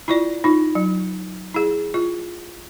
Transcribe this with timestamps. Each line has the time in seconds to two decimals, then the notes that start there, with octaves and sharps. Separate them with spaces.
0.08 E4 F4 D5
0.44 D#4 F4
0.75 F#3
1.54 E4 G#4
1.94 F4